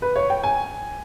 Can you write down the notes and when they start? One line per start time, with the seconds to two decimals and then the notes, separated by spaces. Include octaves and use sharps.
0.02 B4
0.16 C#5
0.30 G5
0.43 G#5